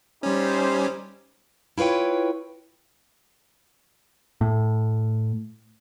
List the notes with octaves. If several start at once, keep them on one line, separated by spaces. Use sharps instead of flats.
G3 C#4 D#4 G4 C5
E4 F4 B4 C#5 G5
A2